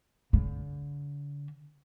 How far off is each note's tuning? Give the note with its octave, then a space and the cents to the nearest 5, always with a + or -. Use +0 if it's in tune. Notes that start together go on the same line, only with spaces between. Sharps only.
D3 -40